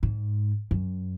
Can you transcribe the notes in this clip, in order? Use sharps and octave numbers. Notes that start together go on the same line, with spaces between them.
G#2
F#2